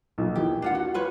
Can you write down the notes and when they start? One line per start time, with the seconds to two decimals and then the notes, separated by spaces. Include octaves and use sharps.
0.18 B1 A#2 F3
0.36 D#2 E3 G4
0.62 D4 F4 F#5
0.75 F#4
0.94 F4 B4 C#5